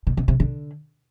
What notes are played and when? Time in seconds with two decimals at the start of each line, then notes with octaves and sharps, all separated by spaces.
0.07 B2
0.17 C3
0.28 C3
0.40 D3